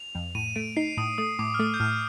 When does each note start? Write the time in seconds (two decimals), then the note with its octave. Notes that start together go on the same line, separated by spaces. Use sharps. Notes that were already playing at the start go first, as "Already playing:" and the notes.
Already playing: F7
0.15 F2
0.35 A2 D#7
0.56 A3 D7
0.77 D#4 C7
0.97 A2 D#6
1.18 A3 D#6
1.39 A2 D6
1.54 F6
1.59 A3 D#6
1.74 G6
1.80 A2 F6